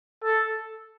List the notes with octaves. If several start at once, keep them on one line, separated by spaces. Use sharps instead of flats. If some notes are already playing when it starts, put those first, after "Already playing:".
A4